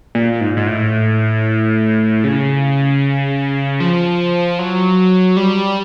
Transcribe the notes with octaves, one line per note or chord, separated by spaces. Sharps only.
A#2
G#2
G#2
A2
C#3
F3
F#3
G3